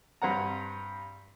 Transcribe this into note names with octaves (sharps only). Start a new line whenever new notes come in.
G2 C4 F#5 A#5